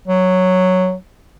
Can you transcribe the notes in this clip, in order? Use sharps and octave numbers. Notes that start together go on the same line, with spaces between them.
F#3